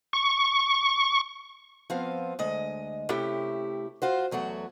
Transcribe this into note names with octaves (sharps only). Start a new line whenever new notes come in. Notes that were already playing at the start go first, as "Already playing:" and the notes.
C#6
F3 B3 C4 F5
D2 G#3 D#5
C3 A3 C#4 E4 G4
F4 F#4 C5
E2 F#3 A3 F#4